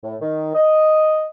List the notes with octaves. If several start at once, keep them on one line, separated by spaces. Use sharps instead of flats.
A2
D#3
D#5